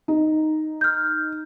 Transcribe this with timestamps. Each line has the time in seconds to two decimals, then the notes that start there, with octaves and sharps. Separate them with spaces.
0.08 D#4
0.81 F6 G6